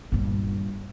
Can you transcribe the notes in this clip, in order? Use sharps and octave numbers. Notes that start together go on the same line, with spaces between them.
G2 A#2